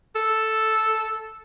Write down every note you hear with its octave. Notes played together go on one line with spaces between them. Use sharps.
A4